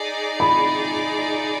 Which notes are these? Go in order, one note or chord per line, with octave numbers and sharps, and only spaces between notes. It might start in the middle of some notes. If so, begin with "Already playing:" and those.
Already playing: D#4 G#4 D5
B5